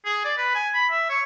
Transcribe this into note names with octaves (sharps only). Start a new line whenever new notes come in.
G#4
D5
B4
G#5
B5
E5
C#5